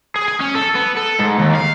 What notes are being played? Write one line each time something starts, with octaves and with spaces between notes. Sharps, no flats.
G#4
G#5
C#4
A4
B3
A4
G#2
D#2
F5